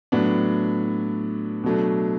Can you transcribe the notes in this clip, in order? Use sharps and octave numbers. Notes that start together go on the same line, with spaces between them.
A2 F#3 B3 D4
B2 F#3 A3 D4